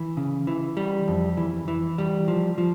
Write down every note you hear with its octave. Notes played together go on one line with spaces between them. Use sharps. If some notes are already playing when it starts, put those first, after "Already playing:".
Already playing: E3
C#3
E3
G3
F2
E3
E3
G3
F3
F3